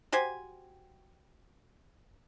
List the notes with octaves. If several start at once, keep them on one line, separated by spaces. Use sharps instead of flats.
F#4 G4 C5 G#5